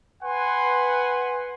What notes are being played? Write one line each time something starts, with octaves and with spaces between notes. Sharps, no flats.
B4 F#5 G#5 C6